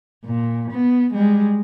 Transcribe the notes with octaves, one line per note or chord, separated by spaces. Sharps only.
A#2
B3
G3 G#3